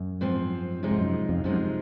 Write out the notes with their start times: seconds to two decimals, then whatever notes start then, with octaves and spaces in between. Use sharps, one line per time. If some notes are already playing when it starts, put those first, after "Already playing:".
Already playing: F#2
0.21 G#2 F3 C4
0.83 C3 F3 G#3 D#4
0.91 G#2
0.98 F#2
1.29 F2
1.44 F#2 C3 F3 G#3 D#4